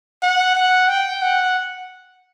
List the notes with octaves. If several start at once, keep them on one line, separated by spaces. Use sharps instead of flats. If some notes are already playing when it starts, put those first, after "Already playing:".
F#5
F#5
G5
F#5